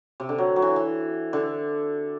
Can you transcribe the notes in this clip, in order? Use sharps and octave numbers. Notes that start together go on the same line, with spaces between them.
C3
D3
F#3
F#3
E3
E3
D3